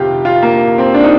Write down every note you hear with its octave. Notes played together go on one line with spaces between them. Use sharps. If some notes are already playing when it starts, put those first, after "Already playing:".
Already playing: F2 C3 D#3 F4 G4
F4
A#3
C4
D4
D#4